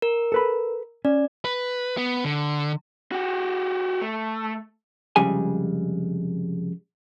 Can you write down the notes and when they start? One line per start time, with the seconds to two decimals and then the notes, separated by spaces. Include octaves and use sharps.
0.02 A#4
0.32 A4 B4 B5
1.05 C#4 D5
1.45 B4
1.97 B3
2.25 D3
3.12 F#4 G4
4.01 A3
5.16 C2 F2 C#3 G3 G#3 G#5